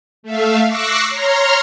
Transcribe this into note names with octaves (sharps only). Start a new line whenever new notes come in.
A3 E5 F5
C#6 D6 E6 F#6 A#6 C7
C#5 A#5 C6 F6